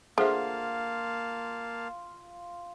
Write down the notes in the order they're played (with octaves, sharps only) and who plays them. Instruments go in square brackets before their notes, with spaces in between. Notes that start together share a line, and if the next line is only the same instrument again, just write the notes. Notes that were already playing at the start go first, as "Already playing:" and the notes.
[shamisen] D3 [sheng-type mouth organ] A#3 F5 A5 [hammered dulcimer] F4 [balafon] G#4 C5 E5